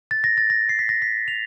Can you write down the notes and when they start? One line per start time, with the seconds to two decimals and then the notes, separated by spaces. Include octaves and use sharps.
0.11 A6
0.24 A#6
0.37 A6
0.50 A#6
0.69 C7
0.79 B6
0.89 A#6
1.02 B6
1.28 F7